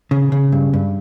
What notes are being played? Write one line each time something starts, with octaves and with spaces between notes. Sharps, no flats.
C#3
C#3
G2
G2